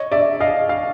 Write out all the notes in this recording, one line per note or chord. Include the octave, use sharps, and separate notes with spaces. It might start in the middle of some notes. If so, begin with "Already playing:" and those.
Already playing: C#5 D#5
D5 E5
D#5 F5
F5